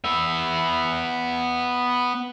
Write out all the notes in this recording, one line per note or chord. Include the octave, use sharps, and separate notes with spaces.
B3 E5